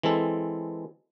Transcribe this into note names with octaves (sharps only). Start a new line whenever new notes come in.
E3 G#3 C4 A4